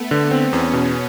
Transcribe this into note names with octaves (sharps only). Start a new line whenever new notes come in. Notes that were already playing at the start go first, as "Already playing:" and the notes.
Already playing: A3 B3
D3
C4
E2 B3 C#4
B2